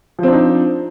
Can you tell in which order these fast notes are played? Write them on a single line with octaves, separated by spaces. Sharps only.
F3 C4 D4 D#4